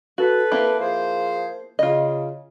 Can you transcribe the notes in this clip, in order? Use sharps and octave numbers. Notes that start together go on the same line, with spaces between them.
F#4 A4 B4
A#3 C4 E4
F3 G#4 C5
C#3 F4 D#5